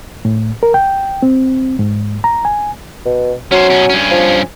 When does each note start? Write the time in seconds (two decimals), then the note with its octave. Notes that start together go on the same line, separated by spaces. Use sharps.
0.25 A2
0.63 A#4
0.74 G5
1.23 C4
1.79 G#2
2.24 A#5
2.45 G#5
3.05 B2
3.52 F#3 C#4 C5
3.70 B2 C#4
3.90 G2 C#4
4.11 F3